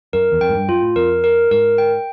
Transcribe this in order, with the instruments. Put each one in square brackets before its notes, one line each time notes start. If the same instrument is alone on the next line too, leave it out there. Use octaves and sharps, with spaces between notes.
[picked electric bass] F#2 [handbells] A#4
[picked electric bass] E2
[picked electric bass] F2 [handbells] G5
[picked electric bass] G#2
G2
[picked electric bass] F#2 [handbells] F4
[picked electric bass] A2
[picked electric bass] F2 [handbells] A#4
[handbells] A#4
[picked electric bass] G#2 [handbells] A#4
[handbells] G5